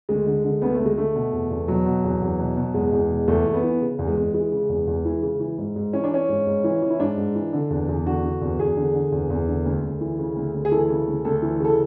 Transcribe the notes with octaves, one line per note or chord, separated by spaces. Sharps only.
D2 G#3
D3
D3
D2 B3
A3
D2
G#3
D3 A3
B2
E2
E2
B2 F#3
B2
E2
E2
B2
B2
E2 G#3
E2
B2
E2 A3
E2
B3
E3
C#3
E2
G#3
E2
E3 G#3
C#3
E2
E2
E3
C#3
E3
G#2
G#2
E3 C#4
D4
E3 C#4
G#2
G#2
E3
E3
E4
G#2 D4
G#2
E3
D3
E2
E2
D3 F#4
D3
E2
E2 G#4
D3
D3
E2
E2
D3
D2
D2
E3
C#3
D2
D2
G#4
E3 A4
C#3
D2
D2 A4
E3
C#3 A4